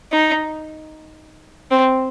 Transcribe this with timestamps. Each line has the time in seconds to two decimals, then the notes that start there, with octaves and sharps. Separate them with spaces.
0.12 D#4
1.71 C4